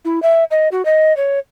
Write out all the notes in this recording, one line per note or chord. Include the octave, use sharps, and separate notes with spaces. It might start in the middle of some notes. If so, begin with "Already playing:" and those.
E4
E5
D#5
F#4
D#5
C#5